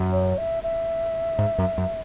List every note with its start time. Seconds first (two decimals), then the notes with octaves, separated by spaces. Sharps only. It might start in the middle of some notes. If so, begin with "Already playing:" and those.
Already playing: F#2
0.12 C#5
0.38 E5
0.63 E5
1.39 G#2
1.58 F#2
1.78 F#2